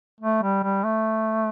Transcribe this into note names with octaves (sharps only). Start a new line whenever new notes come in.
A3
G3
G3
A3